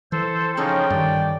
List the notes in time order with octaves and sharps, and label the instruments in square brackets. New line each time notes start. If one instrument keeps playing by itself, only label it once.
[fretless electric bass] E3 [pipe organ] A4 C5
[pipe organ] C#3 F3 D#4 [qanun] C#4 A4 C#5 [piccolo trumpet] G5
[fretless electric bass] G2 D#3 [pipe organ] D5